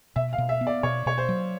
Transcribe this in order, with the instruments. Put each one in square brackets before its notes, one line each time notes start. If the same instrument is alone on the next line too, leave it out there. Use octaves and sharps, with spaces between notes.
[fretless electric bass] B2 [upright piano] E5
[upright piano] F5
[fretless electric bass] B2
[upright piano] E5
[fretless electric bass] B3
[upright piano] D5
[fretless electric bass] B2 [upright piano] C#5
[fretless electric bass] B2 [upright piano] C#5
[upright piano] C5
[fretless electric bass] F#3